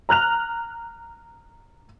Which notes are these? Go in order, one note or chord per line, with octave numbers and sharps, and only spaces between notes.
A#5 F6 F#6 F7